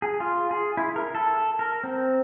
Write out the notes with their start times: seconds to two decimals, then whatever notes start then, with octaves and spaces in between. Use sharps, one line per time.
0.02 G#4
0.20 F4
0.51 G#4
0.77 E4
0.96 A#4
1.15 A4
1.59 A#4
1.84 C4